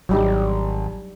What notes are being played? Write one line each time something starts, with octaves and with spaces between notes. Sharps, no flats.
G#1 F#3 G3 D#4